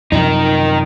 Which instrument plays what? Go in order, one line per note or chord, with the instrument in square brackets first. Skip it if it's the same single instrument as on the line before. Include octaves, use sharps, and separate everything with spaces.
[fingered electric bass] F#2 C3 F3 [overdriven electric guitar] D#3 D#4